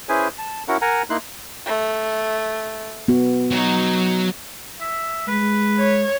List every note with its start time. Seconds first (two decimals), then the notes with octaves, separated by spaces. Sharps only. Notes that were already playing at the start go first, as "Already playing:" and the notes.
0.09 C#4 E4 G#4 B4 C5 G#5
0.38 A5
0.68 C#4 E4 F#4 A#4 F#5
0.82 A#4 F#5 G#5 A#5
1.10 A#3 D#4 E4 C6 F#6
1.66 A3
3.08 B3 F#4
3.51 F#3 D#4 C#5
4.81 E5
5.28 G#3 B4
5.79 C#5